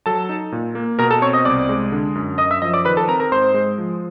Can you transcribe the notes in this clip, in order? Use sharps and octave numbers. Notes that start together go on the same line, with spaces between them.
F#3 A4 A5
D#4
A#2
A#3
B2 A#4 A#5
A4 A5
C4 C#5 C#6
D#5 D#6
C2 D5 D6
G#3
D3
F#2
F#2 D#5 D#6
E5 E6
F3 D#5 D#6
D5 D6
D#3 B4 B5
A4 A5
C4 A#4 A#5
A#4 A#5
G#2 C5 C6
G#3
F3